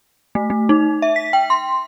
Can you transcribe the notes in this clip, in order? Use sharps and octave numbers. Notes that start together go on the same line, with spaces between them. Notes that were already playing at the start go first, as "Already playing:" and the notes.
A3
A3
D#4
E5
B6
G5
C6